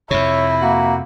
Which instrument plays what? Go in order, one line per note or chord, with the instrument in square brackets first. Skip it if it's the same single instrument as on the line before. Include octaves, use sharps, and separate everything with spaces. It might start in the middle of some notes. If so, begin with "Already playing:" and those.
[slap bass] F2 C3 [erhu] E4 [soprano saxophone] C#5
[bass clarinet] A#3 [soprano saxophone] F#4